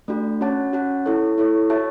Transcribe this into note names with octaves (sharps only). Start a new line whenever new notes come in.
A3 D4 F#4
C#4 F#4 C#5 F#5 A5
C#4 F#4 C#5 F#5 A5
E4 A4 C#5
E4 A4 C#5
F#4 C#5 E5 A5